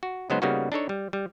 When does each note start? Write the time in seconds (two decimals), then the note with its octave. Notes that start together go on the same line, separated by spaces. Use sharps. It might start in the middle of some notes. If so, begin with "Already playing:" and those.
0.03 F#4
0.30 C#3 F#3 G#3 B3 D#4 C5
0.42 C#3 G3 A#3 B3 D#4 F#4
0.72 D4 D#4 A4 C#5
0.89 G3
1.13 G3